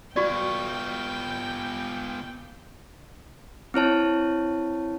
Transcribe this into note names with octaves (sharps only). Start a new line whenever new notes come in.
B3 F4 F#4 D5 G5 C#6
C4 E4 C#5 A5